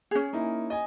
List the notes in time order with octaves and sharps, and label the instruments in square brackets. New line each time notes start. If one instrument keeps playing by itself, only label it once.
[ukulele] C#4 G#4
[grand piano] A#3 D#4 E4
D#5 G#5